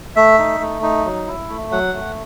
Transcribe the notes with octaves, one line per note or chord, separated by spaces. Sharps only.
A3 E5
D#4
A3
D#4
F#3
E4
A3
F#3 F#5
A3